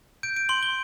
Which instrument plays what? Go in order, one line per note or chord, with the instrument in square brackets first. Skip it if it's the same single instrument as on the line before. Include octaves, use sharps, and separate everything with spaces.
[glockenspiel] G6 D7
D7
C6 F#7
G7